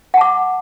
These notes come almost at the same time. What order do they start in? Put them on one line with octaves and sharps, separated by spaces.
F#5 A5 D6